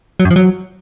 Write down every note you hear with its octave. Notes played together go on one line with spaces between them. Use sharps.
F#3
F#2
F3
F#3